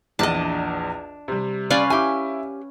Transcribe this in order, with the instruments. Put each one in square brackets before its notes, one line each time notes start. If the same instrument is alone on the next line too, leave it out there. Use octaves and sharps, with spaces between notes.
[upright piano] A#1 E2 [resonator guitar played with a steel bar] D4 [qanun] D#5 A5
[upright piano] C3 G3
[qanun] C#4 B4 F5 [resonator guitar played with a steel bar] D5
[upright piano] E4 [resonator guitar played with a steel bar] G4 G#5